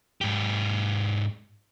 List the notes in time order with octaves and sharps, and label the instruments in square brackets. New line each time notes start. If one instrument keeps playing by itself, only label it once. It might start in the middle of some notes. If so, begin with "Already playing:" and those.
[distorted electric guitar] G#2 G4